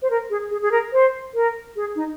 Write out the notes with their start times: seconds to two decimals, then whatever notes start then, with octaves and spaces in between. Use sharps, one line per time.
0.02 C5
0.10 A#4
0.30 G#4
0.51 G#4
0.62 G#4
0.72 A#4
0.93 C5
1.34 A#4
1.76 G#4
1.96 D#4